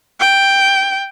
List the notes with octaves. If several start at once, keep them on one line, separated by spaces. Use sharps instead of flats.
G5